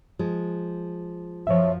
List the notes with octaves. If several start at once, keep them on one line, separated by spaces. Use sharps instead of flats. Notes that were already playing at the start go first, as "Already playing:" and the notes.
F3 G#3
F#2 F3 C#5 E5